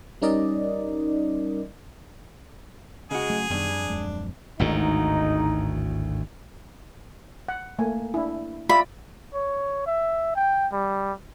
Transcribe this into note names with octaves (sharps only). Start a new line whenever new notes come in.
G3 C#4 D#4 A#4 D5 D#5
C#3 G#3 F#4 G#4
F#3 A3
F#2 B2 D#3 G3 D4 G#5
F2
D#1 F#2 G#3
G#1 D2 A2 D#4
F#5
A3 A#3 G#5
D4 E4
F4 D5 E5 B5
C#5
E5
G5
G3